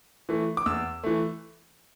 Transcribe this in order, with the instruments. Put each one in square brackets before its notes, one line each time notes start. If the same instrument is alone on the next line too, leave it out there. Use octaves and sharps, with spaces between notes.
[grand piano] E3 A3
D6
E2 E6
E3 A3